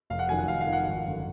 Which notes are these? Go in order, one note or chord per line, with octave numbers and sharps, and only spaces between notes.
F1 F5
F#5
F2 D#3 F#3 G#5
F#5
F1 F5
F5
F2 D#3 F#3
F#5
G#1
F#2 D3